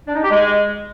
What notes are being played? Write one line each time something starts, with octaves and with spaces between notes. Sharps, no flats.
D4
D#4
G4
G#3